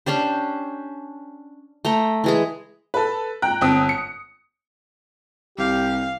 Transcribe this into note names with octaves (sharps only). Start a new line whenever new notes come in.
C#4 D4 G4 C5
A3 G5 A#5
E3 G#3 G#4
A4 B4
G5 A#5 F#6
G1 C4 D#6 D7
C#7
C2 G4 F5